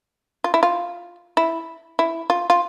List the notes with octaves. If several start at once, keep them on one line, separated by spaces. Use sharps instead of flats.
F4
E4
F4
E4
E4
F4
F4